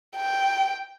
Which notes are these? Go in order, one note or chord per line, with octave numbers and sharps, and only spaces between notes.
G5